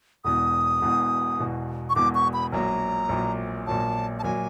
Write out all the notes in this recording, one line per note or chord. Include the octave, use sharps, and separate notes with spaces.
E1 E2 B2 D#6
E1 E2 B2
E1 E2 B2
C#6
E1 E2 B2 D6
C#6
B5
A#1 A#2 F#3 A#5
A#1 A#2 F#3
A#1 A#2 F#3 A5
A5
A#1 A#2 F#3 G#5